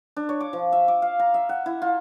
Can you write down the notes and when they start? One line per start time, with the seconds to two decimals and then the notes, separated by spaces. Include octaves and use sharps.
0.17 D4
0.29 C#5
0.40 D6
0.53 F3
0.72 E5
0.88 D6
1.02 F5
1.19 A#5
1.34 E5
1.49 F#5
1.66 E4
1.82 F4